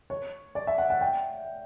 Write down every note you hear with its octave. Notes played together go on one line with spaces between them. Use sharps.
C#5
D5
E5
F#5
F#5
G5